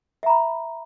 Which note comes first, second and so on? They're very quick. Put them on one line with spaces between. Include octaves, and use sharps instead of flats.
E5 A#5 B5